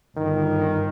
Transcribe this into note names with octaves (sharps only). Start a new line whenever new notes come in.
G1 D#3